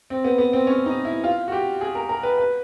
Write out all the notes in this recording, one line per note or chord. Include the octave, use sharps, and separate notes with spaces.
C4
B3
B3
C4
C#4
D#4
E4
F4
F#4
G4
G#4
A#4
A#4
B4
B4